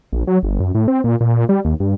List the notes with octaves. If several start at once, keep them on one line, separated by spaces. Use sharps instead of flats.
A#1
F#3
G1
F#2
A2
C4
A#2
A#2
G3
D#2
G2